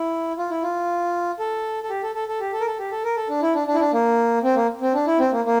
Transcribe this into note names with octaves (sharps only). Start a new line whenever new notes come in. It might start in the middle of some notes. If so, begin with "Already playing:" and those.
Already playing: E4
F4
E4
F4
A4
A4
G4
A4
A4
A4
G4
A4
A#4
A4
G4
A4
A#4
A4
D4
E4
D4
D4
E4
D4
A#3
C4
A#3
C4
D4
E4
C4
A#3
A#3